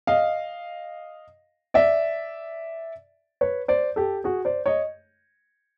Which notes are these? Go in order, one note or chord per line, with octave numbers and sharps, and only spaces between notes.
D#5 F5
D5 E5
B4 C#5
C5 D5
G4 A4
F#4 G#4
C5 D5
C#5 D#5